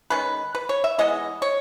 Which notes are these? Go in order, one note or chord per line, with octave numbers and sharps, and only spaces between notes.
D#3 G#3 C#4 B4
B4
C#5
E5
E3 G#3 B3 D#5
C#5